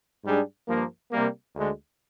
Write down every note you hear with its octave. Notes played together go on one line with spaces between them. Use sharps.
G#2 G3 D4 G#4
G2 F3 A#3
C3 G3 A#3
D2 D3 G#3